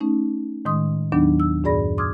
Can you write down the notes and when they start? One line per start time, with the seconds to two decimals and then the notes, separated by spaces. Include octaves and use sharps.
0.01 A3 C#4 D#4
0.65 A2 D#3 G#3 C6 D#6
1.12 D#2 D#3 F#3 B3 D4 D#4
1.40 E6
1.64 F#2 A2 G#4 D5 B5 A#6
1.98 C6 D6 D#6 F6 G#6